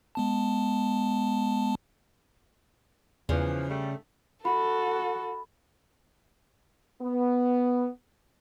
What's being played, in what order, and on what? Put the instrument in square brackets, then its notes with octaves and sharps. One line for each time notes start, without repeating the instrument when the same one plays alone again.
[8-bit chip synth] G#3 B3 A5
[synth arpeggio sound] E2 [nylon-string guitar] C#3 [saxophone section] E3 F3
[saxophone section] G3 A3
[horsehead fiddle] F#4 [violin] A4 [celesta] B5
[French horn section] B3